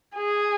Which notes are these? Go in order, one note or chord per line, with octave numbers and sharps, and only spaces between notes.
G#4